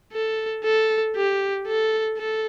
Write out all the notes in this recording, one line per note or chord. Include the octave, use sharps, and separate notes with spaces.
A4
A4
G4
A4
A4